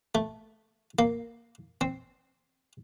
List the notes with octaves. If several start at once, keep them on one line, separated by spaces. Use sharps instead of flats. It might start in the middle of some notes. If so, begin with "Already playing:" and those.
A3
A#3
C4